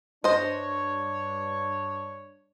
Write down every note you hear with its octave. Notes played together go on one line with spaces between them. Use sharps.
G2 D4 C5 C#5 D#5